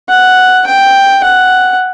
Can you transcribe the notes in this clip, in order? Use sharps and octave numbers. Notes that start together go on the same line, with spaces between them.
F#5
G5
F#5